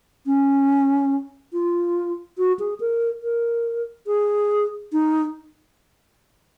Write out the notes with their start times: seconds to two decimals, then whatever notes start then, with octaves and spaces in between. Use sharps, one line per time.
0.26 C#4
1.53 F4
2.38 F#4
2.59 G#4
2.80 A#4
3.23 A#4
4.07 G#4
4.92 D#4